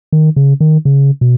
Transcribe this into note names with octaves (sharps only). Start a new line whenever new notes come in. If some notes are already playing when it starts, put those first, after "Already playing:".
D#3
C#3
D#3
C#3
B2